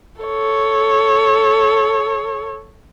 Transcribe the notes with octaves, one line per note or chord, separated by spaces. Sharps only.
A4 C#5